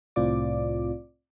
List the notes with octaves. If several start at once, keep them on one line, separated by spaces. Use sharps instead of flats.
C2 A2 C4 F4 D5 D6